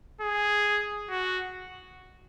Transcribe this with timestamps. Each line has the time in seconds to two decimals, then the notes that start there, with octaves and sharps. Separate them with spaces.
0.21 G#4
1.10 F#4